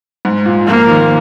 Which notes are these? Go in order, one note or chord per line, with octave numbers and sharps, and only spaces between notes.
G#2
A#2
F3 A#3
D#3